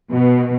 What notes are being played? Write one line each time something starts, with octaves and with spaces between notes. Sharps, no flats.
B2